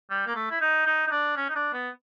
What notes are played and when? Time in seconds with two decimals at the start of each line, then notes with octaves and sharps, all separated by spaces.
0.10 G3
0.27 A#3
0.36 A3
0.51 E4
0.61 D#4
0.86 D#4
1.07 D#4
1.11 D4
1.37 C#4
1.49 D#4
1.56 D4
1.74 B3